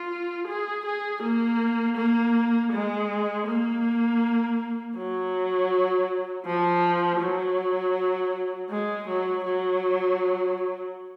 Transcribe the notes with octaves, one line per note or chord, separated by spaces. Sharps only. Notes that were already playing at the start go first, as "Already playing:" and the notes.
Already playing: F4
G#4
G#4
A#3
A#3
G#3
A#3
F#3
F3
F#3
G#3
F#3
F#3